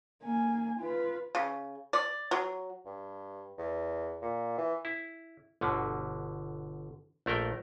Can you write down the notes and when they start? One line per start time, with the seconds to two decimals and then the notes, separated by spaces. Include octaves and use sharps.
0.23 A#3 G#5
0.79 F4 B4
1.35 C#3
1.93 D5
2.31 F#3
2.85 G2
3.58 E2
4.22 A#2
4.58 E3
4.85 E4
5.61 G1 B2 D3
7.26 A#1 A3 A#4 G5